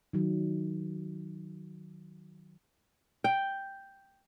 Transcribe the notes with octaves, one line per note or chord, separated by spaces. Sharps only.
D#3 F#3
G5